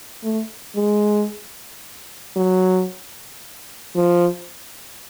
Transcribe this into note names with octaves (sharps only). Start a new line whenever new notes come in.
A3
G#3
F#3
F3